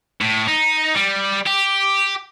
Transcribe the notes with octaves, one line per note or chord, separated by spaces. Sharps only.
A2
D#4
G3
G4